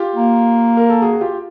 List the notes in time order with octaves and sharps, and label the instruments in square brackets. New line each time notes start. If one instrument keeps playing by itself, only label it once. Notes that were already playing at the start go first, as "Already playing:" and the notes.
Already playing: [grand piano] F4 G4
[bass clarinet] A#3
[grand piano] A#4
A4
F#4 G#4
F#4
F4 G4